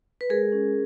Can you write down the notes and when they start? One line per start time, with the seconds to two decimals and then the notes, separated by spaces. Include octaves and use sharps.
0.21 B4
0.29 G#3 G#4 A#4
0.52 C#4